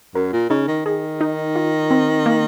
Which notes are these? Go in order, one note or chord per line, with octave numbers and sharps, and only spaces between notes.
F#2 A#4
A#2
C#3 D#4
D#3
D#3 G#4
D#4
F4
C4
A#3